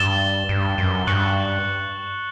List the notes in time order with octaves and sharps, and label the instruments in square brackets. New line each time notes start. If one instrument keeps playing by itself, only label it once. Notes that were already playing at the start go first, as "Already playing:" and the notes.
Already playing: [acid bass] G2 [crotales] A6 E7 G7
[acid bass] G2
F#2
[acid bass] G2 [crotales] C#6 F#6 C#7 F#7